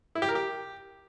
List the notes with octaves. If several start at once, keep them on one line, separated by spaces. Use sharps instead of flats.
E4
G4
A#4
G4